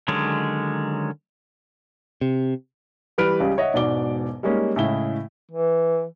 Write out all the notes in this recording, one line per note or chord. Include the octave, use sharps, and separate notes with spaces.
D3 D#3 F#3 G#3 C#4
C3
E3 G3 B4 F6 D7
C#2 C#3 G3
C#5 D#5 E5 F#5
E1 G#2 B2 D5 D6 G7
G3 G#3 A#3 C#4 D#4
A2 C#3 G#3 E4 G7
E3